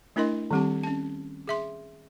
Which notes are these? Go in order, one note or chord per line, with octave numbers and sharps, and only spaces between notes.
A3 D4 E4 A#4 D#5 C6
D#3 G3 C4 G4 A5
C#4 A5
G#4 E5 C6